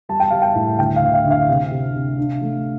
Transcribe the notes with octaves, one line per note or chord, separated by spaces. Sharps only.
G3 A5
G5
G3 F5
G5
A2
D2 G5
F5
D2
F5
D3
F5
C3
C3
C3
D4
A3